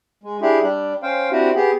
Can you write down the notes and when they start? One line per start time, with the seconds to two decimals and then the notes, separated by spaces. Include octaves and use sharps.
0.23 G#3
0.42 D4 E4 G4 G#4
0.62 G3 D4
1.03 C#4 C5 F5 G5
1.32 C4 D4 E4 F#4 G4
1.55 B3 G4 G#4